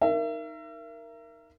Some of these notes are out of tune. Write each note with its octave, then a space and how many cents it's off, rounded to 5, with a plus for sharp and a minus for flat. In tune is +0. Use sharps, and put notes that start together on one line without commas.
D#4 +0 A#4 +0 E5 +35